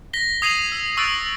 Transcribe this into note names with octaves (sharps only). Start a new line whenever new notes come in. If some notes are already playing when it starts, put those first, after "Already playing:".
A#6 B6 G7
D#6 G#6 C7 D#7 F7 F#7
E6
C#6 E6 F#6 A6 D7